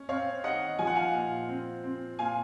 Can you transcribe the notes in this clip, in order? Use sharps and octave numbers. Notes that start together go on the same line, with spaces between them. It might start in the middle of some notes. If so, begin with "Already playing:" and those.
Already playing: C#4
C4 C#5 F5
D#3 D#5 F#5
F3 G#5
F#5
F5 G#5
A#2
C4
C4
A#2 F5 G#5